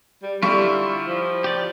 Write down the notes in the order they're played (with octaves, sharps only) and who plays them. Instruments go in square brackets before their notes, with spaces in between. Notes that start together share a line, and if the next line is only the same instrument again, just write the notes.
[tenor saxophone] G3
[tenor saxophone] D3 [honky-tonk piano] G3 [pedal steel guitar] E4 F4 [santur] C#6
[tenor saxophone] F3
[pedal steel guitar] G4 D5